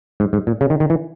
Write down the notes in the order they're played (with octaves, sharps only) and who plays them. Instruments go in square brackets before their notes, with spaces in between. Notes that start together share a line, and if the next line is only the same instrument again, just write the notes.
[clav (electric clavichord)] G#2
G#2
A#2
C#3
D#3
D#3
E3